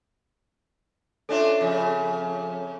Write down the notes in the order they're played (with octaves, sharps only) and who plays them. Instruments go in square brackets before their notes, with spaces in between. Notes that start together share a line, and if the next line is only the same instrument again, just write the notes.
[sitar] C#4 D4 F4 [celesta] A4 C#5 E5
[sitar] F2 C#3